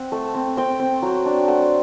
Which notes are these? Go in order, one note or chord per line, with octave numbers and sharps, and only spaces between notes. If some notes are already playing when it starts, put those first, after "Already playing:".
Already playing: C4 F#5
A3
C4
C4 G5
C4
F#3
D4
A3 F#5